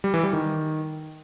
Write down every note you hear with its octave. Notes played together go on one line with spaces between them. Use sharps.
G3
E3
G3
D#3